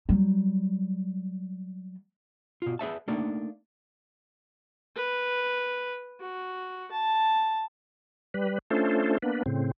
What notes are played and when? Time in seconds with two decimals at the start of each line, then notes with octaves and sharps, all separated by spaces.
0.09 F#3 G3
2.62 B2 F4
2.79 G#4 B4 E5 A5
3.08 A3 A#3 D4 D#4
4.96 B4
6.21 F#4
6.92 A5
8.34 G3 B4
8.71 A3 C#4 D4 F4 A4 C5
9.22 A#3 B3 D4 B4
9.46 A2 C#3 C4